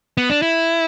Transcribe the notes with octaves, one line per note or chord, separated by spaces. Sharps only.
B3
D4
E4